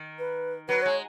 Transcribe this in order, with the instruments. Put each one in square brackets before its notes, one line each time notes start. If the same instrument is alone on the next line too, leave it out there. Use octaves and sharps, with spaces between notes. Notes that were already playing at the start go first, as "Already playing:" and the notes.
Already playing: [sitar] D#3
[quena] B4
[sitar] F#3 [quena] B4
[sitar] G#3 [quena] C#5